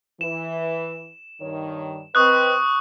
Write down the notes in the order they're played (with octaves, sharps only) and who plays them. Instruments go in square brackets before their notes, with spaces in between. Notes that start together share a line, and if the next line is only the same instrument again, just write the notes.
[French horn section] E3 [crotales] E7
[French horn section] G2 D#3 C#5
[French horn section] C4 B4 D#5 [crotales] C#6 D#6 F#6